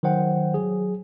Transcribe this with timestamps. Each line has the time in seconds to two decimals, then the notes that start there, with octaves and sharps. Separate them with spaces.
0.03 D#3 F#3 C5 F#5 G5
0.54 F#3 G#4